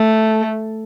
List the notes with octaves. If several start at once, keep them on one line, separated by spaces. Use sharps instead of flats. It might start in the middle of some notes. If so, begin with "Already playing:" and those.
Already playing: A3